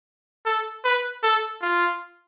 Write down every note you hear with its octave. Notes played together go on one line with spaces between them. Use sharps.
A4
B4
A4
F4